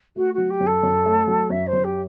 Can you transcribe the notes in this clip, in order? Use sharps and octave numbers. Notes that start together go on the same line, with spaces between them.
A3 F#4
F#3 F#4
G4
F#2
A4
F#2
A3
F#3
F#2 E5
C5
F#2
G4